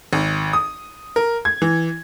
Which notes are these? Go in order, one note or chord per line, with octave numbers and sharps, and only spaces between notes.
G#1
D#6
A#4
G#6
E3